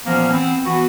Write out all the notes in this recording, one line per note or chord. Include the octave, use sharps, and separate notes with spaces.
A#2 E3 F3 A#3 B3 C#4
E3 B3 C4
E3 B3 F#4